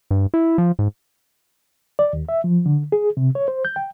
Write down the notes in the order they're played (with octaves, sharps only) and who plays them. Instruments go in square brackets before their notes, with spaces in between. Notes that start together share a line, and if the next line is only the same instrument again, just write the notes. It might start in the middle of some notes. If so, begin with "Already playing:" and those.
[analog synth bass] G2
E4
F3
G#2
[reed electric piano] D5
D#2
E5
F3
D3
G#4
C3
C#5
C5
G6
G5